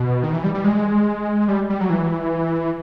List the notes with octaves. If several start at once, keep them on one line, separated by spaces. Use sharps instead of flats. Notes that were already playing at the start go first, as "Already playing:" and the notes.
Already playing: B2
D#3
E3
G3
G3
G#3
G3
G3
F#3
E3